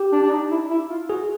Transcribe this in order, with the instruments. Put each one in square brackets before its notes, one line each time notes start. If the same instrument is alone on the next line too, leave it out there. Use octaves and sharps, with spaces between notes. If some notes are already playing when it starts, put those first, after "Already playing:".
Already playing: [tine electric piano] G4
[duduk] D4
D4
D#4
E4
E4
F4
[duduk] F#4 [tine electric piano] G#4